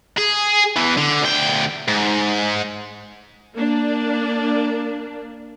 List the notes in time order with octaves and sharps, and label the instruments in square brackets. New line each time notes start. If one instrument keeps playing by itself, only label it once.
[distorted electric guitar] G#4
E2 E3
D3
D2 G5
G#2
[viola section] A#3 D4